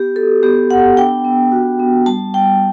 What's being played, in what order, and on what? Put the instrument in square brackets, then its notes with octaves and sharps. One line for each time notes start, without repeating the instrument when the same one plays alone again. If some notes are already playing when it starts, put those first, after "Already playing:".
Already playing: [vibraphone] B3 G4
F#4 A4
B3 G4
B3 F#5
D4 G5
B3
F#4
B3
G3 A5
G3 G5